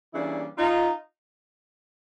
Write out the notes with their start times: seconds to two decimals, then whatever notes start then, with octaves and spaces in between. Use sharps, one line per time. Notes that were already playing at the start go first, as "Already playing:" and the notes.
0.13 C#3 E3 G3 A#3 D4 E4
0.57 D#4 F4